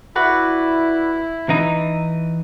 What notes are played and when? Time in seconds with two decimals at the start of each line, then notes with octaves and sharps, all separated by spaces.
0.15 E4 F#4 B4 D5
1.49 E3 D#4 A#5